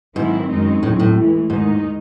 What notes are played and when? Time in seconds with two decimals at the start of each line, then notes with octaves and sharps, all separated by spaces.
0.16 G#2 D#3 F#3 C4 E4
0.50 F#2 D#3 G#3 C4 D#4
0.82 D#2 A2 C#3 F#3 C4
1.00 A2
1.16 A2 E3 G#3
1.50 D#2 G#2 D#3 G#3 D#4